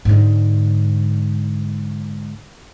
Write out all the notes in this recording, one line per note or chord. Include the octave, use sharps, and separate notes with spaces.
G#2 D3